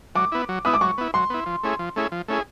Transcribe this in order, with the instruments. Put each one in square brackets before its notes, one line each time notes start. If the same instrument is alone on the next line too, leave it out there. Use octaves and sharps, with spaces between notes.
[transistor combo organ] F#3 [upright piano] D6
[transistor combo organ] B3 E4
F#3
[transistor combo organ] B3 E4 [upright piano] D#6
[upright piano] D6
[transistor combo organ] F#3 [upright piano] C#6
[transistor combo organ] B3 E4
[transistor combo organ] F#3 [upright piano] C6
[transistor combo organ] B3 E4
F3
A3 C#4 E4 G#4
F3
A3 C#4 E4 G#4
F3
A3 C#4 E4 G#4